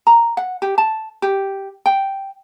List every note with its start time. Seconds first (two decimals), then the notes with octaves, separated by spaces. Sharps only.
0.07 A#5
0.37 F#5
0.62 G4
0.78 A5
1.22 G4
1.86 G5